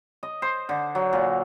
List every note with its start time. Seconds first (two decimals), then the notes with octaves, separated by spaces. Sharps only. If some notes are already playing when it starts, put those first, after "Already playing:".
0.23 D#5
0.42 C5
0.69 D3
0.95 F#3
1.13 A#2